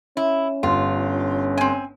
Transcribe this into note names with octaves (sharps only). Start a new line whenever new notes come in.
C#4 E4
G1 F4
C4 G#5